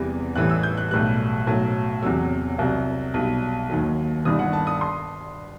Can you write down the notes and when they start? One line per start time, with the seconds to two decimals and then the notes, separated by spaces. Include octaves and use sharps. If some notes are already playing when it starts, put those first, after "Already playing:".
Already playing: E2 C3 E3 G3
0.35 A1 A2 E3 G3 F#6
0.50 E6
0.63 G6
0.77 F#6
0.91 B1 A2 G3 F#6
1.47 B1 A2 F#3
2.03 E2 C3 F#3 E6
2.59 C2 C3 F#3
3.14 B1 B2 G3
3.70 D#2 D#3 F#3
4.25 G1 G2 D#3 D#6
4.39 F#5
4.53 A5
4.67 D#6
4.81 C6